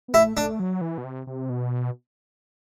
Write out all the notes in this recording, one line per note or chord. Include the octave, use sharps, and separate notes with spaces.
B3
A3 E4
A3 D4
F#3
E3
B2
C3
C3
B2